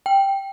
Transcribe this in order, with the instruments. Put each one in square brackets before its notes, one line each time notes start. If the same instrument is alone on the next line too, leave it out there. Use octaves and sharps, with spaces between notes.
[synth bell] G5